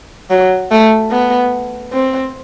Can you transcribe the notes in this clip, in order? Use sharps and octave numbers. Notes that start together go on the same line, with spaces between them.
F#3
A3
B3
C4